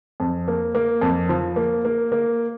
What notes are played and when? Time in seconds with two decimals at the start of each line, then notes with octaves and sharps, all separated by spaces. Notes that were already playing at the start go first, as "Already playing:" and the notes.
0.20 F2
0.48 A#3
0.75 A#3
1.01 F2
1.29 F3
1.56 A#3
1.85 A#3
2.12 A#3